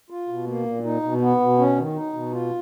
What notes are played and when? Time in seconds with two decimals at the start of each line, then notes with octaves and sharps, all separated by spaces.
0.10 F4
0.29 B2
0.47 A#3
0.65 A#2
0.84 D#4
1.03 B2
1.21 B3
1.40 B2
1.59 C#4
1.77 D#3
1.95 D#4
2.14 B2
2.32 F4